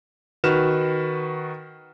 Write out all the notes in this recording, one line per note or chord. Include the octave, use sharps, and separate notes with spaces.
D#3 F#4 B4 F6 E7